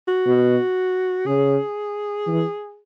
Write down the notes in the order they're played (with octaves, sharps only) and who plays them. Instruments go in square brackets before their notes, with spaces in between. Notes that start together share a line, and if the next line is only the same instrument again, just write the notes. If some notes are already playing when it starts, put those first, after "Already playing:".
[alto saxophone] F#4
[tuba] B2
[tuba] C#3 [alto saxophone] G#4
[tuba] E3